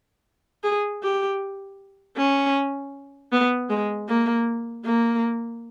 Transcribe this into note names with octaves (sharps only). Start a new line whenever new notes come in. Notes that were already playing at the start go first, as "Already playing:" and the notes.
G#4
G4
C#4
B3
G#3
A#3
A#3